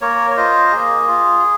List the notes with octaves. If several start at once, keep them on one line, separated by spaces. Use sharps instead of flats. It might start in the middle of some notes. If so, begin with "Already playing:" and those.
A#3 A#4 C#5
C#5
F4 C5 D#5
A#3 G#4
F4